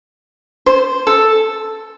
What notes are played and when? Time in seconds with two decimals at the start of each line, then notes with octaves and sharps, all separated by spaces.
0.66 C5
1.07 A4